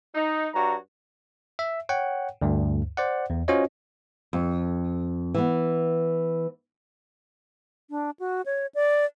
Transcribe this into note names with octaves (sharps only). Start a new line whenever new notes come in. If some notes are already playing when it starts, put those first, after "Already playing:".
D#4
G2 F#4 C#5 A#5
E5
C#5 F#5 G5
D2 G2
C5 D5 F#5
E2
C#4 F4 F#4 C5 C#5 D#5
F2
E3 B3
D4
F#4
C#5
D5